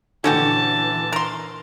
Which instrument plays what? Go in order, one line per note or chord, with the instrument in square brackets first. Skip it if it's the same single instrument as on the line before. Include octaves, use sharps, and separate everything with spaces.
[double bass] A#2 E3 [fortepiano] D3 [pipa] C#4 F#4 G4 [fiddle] A5
[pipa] A#4 C6